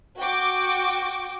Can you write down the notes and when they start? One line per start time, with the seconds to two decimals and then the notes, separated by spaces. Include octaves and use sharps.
0.18 F#4 G5 C#6 D6